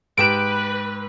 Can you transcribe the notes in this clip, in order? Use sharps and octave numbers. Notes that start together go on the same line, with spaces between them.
G#2 G4 B4 D7 E7